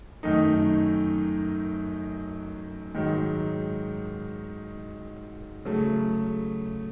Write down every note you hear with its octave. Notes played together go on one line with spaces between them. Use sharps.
F#2 D#3 A3 D#4
G#2 D#3 F#3
C#3 F#3 A3